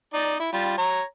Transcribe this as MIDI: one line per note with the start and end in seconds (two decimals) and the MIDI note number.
0.14 0.35 63
0.14 0.35 74
0.40 0.48 64
0.53 0.73 55
0.53 0.73 65
0.78 1.03 73
0.78 1.03 82